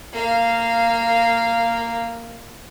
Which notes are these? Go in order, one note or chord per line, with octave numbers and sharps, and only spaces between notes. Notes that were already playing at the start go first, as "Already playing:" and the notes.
A#3 F5